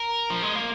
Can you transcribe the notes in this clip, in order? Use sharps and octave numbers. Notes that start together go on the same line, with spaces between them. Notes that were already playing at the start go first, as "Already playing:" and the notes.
Already playing: A#4
F3
G#3
A#3